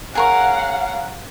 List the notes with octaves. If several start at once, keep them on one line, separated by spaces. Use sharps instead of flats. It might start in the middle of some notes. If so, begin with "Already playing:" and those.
G#4 A#4 C#5 F5 F#5